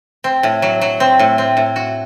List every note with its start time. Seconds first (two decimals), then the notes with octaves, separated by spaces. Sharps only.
0.24 C4
0.43 A2
0.62 F#3
0.81 F#3
1.00 C4
1.19 A2
1.38 C4
1.57 A2
1.76 F#4